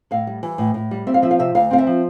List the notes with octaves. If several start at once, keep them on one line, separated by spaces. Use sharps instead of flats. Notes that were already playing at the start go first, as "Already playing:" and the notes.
A2 F5
G3
E3
A2
A2
G3
C4 E5
F5
F3 E5
F5
C3 E5
D2 F5
C4 F5
E5
F3